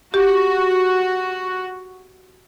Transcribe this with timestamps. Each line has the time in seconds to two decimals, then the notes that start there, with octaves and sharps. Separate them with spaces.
0.14 F#4 G4